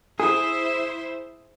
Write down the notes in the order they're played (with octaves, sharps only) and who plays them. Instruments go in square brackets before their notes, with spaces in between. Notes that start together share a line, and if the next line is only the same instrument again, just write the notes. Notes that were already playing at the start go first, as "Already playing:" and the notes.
[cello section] E4 C5 E5 [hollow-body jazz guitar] G#4